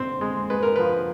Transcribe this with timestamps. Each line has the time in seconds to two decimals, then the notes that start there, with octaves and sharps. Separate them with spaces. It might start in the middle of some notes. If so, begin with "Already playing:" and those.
Already playing: C4
0.21 G#3
0.50 G#3 B4
0.63 A#4
0.76 F3 B4